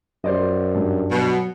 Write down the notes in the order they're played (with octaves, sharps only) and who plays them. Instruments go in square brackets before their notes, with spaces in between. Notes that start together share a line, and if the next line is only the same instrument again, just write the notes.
[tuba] F#2 [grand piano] C5 D5 D#5
[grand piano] G2
[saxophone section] B2 [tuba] F#3